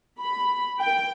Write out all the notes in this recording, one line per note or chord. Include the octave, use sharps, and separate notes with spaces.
B5
G5